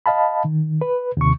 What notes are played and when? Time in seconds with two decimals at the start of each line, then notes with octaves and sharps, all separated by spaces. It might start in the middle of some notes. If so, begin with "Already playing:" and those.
0.06 D#5 F5 A5 B5
0.45 D#3
0.81 B4
1.17 D#2 C3 C#6